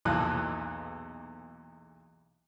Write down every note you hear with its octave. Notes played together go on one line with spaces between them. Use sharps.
B1 E2 A#2 E3 A5 F#6